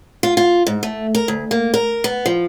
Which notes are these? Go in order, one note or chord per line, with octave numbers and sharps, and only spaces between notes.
F4
F4
G#2
A3
A#4
D2
A#3
A#4
B3
F3